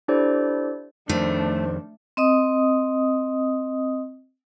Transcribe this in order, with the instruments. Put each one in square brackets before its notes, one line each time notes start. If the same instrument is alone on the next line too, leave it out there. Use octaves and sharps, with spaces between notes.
[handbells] D4 E4 G4 A4 C5 D5
[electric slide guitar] F2 D#3 [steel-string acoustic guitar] A3 [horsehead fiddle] D4 [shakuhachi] C5
[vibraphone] C4 D#5 D#6